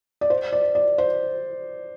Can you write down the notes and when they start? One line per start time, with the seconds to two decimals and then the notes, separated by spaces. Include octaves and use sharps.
0.21 D5
0.30 C5
0.53 D5
0.75 D5
0.98 C5